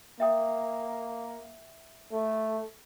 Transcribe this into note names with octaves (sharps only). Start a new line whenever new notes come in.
A#3 E5 G5 D#6
A3